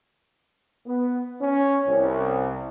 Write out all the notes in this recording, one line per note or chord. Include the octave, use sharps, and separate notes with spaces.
B3
C#4
C2